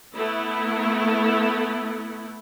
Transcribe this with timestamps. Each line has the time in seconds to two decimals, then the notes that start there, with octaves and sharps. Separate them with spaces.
0.15 A3 B3 E4